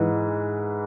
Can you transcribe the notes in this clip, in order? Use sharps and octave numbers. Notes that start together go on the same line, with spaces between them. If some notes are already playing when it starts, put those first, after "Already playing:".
Already playing: G#2 E3